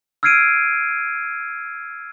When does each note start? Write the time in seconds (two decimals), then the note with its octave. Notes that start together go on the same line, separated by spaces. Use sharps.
0.23 E6 F6 G#6 C7 D7 D#7